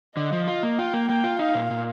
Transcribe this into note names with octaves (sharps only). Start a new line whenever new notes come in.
D3 D#5
F3
F4
A#3
F4 G5
A#3
A#3 G5
F4
D#4 F5
A#2
A#2